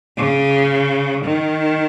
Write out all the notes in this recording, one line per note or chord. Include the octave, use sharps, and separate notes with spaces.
C#3
D#3